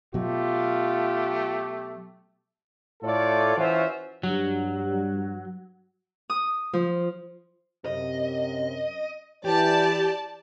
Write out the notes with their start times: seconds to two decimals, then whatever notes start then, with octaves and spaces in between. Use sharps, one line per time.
0.14 B2 F#3 A3 F4 G4
3.03 A2 A3 F4 A4 C#5 D5
3.57 E3 C#4 F4 F#4 C5 E5
4.23 G2 F#3
6.30 D#6
6.73 F3
7.86 F#2 C3 D#5
9.45 E3 G4 D5 A5